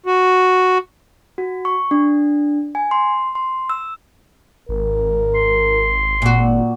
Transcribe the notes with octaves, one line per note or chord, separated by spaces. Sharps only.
F#4
F#4
C#6
D4
G#5
C6
C6
E6
G#1 A#4
C6
A#2 F#4